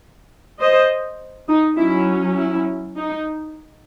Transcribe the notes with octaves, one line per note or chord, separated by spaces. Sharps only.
C5 D#5
D#4
F#3 C#4 E4
E4
D#4